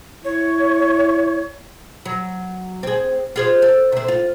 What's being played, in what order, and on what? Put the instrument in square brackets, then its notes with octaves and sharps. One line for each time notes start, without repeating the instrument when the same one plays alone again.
[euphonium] E4 [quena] C#5
[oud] F#3
C4 G#4
F4 G#4 C5
A4
C3 C4
F4